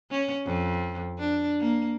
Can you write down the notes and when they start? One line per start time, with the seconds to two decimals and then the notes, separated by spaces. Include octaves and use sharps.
0.11 C#4
0.45 F2
1.19 D4
1.60 A#3